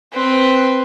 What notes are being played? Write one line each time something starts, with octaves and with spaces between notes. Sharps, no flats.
C4 B4